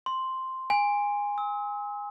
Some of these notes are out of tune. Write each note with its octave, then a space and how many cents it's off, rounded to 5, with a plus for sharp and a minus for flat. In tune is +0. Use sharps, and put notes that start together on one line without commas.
C6 +0
G#5 -20
E6 -45